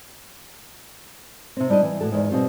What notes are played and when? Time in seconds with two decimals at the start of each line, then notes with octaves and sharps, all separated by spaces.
1.57 C3 C4
1.70 G3 D4 E4 D#5
1.83 E3
2.01 A2 F#4 A4
2.12 E2 G#2
2.30 B2 G3 C4 F4 C#5